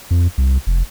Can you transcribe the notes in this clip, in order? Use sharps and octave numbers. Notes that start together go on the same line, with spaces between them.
F2
C2
F1